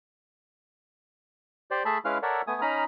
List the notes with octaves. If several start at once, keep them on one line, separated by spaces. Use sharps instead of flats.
G4 C5 D5
A3 G#4 E5 A5 B5
G#3 C#4 E4 B4 F5 F6
A4 A#4 C#5 D5 E5 F#5
A3 B3 G#5 D#6
C#4 D#4 A#5 B5 D#6 F6